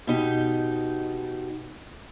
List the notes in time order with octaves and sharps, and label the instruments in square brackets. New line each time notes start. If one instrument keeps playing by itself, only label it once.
[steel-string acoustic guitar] B2 D#4 G4